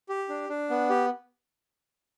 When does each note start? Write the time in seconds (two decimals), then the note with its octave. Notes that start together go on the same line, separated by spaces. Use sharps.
0.09 G4
0.29 D4
0.49 D4
0.70 B3
0.90 G4